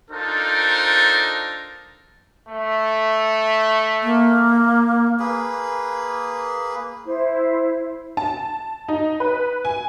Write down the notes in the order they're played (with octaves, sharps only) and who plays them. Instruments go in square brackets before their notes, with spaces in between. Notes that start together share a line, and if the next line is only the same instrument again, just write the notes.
[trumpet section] D4 D#4 F4 A4 A#4 C5
A3
[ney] A#3
[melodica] A#3 G#4 B4
[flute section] E4 C5
[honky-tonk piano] A5
D#4
B4
G#5